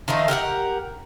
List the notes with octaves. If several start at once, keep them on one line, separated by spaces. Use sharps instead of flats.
D#3 F3 A3 D#4
G4 A#4 E5 F#5